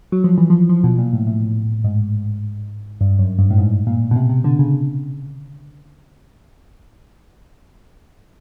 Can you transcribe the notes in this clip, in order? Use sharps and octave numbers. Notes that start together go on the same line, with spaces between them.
F#3
F3
E3
F3
F3
B2
A#2
A2
A2
G#2
G2
F#2
G2
A2
G#2
A#2
B2
C3
C3
D3
C#3